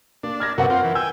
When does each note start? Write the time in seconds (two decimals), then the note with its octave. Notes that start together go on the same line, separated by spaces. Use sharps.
0.24 A#3 D4
0.40 F6 G#6 A#6
0.58 F#2 C3 F#4 A#4 B4 F#5
0.70 C4 F4
0.84 E3
0.95 G5 G#5 E6